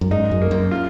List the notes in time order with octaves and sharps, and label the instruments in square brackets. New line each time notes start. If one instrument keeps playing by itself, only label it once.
[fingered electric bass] F#2
[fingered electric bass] G#2 [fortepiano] D#4
[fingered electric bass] F#2
[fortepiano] A#3
[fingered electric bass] F#2
[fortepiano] F4